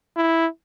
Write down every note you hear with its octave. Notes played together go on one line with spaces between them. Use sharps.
E4